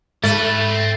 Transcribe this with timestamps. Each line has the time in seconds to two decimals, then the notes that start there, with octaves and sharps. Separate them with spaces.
0.23 G#2 G3 A3 B4 A6
0.71 C4